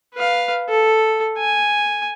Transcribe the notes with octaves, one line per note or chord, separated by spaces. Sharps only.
B4 F5
A4
G#5